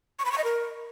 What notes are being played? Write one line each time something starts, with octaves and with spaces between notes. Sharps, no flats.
C#6
B5
C#6
D#5
A#4